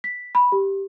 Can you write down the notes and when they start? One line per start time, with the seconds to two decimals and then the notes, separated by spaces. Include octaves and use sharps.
0.04 B6
0.35 B5
0.52 G4